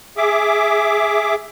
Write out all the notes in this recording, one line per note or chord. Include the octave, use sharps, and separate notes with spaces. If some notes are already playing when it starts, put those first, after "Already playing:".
G#4 E5 D6